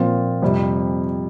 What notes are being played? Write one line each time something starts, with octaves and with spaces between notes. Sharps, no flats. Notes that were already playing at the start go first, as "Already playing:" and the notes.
Already playing: A#2 F3 C4 F4
F2 C3 G3